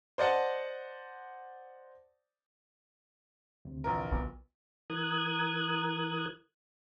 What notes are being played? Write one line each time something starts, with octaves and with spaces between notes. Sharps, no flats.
C5 D5 D#5 F#5 A5
D2 C3
A#1 E3 A#4
B1 B2
E3 A#4 D#6 F#6 G#6